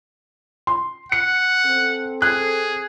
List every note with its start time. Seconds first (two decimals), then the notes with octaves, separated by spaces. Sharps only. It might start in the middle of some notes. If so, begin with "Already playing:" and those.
0.67 C6
1.12 F#5 C#7
1.66 C4 A4
2.22 G#4 F#6